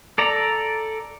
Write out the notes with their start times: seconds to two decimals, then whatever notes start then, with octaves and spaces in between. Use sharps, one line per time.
0.18 A4 D5 A#5